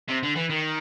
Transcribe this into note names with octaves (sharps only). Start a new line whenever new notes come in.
C3
D3
E3
D#3